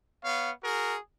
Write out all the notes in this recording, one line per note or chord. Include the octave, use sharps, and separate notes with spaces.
B3 C#5 F5
F#4 G#4 A#4